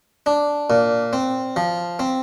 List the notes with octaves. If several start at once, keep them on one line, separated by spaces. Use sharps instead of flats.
D4
A#2
C4
F3
C4